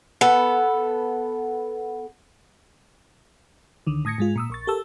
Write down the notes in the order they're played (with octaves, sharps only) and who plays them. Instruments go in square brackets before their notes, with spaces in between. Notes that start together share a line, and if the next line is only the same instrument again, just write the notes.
[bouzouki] B3 A4
[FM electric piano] C#2 D3 D#3
A2 D#6 G#6 A#6 C#7
G#2 G#3 F4
A#2 D#6 E6
A#1 C#6 A6
G4 A4 A#4 A5 E6